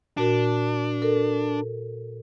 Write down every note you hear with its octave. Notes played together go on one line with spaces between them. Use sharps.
A#2 D4 F#4 A#4
A4 A#4